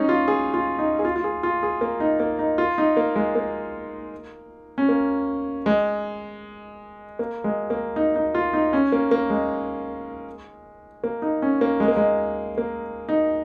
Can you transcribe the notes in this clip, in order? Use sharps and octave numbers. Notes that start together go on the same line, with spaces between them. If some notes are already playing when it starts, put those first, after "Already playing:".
Already playing: G#3 C#4 D#4
F4
G#4
F4
D#4
G#4
F4
F4
G#4
F4
G#4
A#3
D#4
A#3
D#4
F4
D#4
A#3
G#3
A#3
C#4
A#3
G#3
A#3
G#3
A#3
D#4
D#4
F4
D#4
C#4
A#3
A#3
G#3
A#3
D#4
C#4
A#3
G#3
A#3
G#3
A#3
D#4